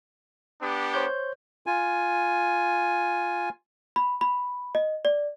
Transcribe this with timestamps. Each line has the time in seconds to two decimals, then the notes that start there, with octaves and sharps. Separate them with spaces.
0.61 B3 D4 G4
0.94 C5 C#5 G6
1.66 F4 G#5
3.96 B5
4.21 B5
4.75 D#5
5.05 D5